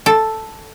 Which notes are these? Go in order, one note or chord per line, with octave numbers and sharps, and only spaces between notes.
A4